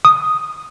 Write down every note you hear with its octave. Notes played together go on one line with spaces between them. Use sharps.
D#6